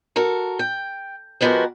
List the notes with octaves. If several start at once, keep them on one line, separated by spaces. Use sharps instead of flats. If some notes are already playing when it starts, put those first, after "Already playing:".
F#4 A4 A#4
G5
F3 G#3 B3 F#4 G4 A#4